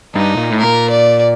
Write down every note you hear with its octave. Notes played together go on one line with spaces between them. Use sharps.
G2 D#4
A#2
A2
A#2 A#4
D5